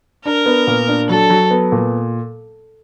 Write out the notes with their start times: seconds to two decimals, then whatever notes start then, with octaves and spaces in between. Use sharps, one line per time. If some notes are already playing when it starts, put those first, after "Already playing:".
0.25 D4 A#4
0.46 B3
0.67 A#2
0.88 D4
1.09 F#3 A4
1.30 F#3
1.51 B3
1.72 A#2